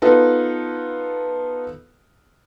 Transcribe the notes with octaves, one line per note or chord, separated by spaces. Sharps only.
B3 D#4 F4 A4 B4